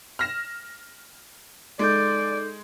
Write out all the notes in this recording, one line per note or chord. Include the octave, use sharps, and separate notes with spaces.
F6 A#6 E7
G#3 D#4 A4 D5 G6